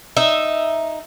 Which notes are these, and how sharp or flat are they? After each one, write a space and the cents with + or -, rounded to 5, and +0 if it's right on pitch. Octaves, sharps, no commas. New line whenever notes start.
D#4 +0 E5 +0